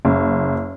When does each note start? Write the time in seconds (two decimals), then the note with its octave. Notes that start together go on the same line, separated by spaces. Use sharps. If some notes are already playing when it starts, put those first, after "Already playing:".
0.05 F#1